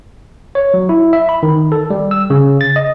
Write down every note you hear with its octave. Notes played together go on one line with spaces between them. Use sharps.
C#5
F#3
E4
E5
B5
D#3
A4
G3
E6
C#3
A6
D#5